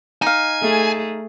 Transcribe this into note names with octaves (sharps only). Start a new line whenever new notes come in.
D#4 F5 G#5
A3 G#4